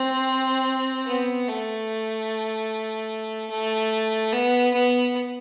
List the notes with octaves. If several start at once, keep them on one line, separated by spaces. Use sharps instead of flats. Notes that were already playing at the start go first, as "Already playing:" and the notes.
Already playing: C4
B3
A3
A3
B3
B3